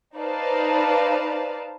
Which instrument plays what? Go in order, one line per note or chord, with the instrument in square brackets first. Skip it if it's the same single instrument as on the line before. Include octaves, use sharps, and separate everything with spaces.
[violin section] D#4 B4 C5 D5 F5 A5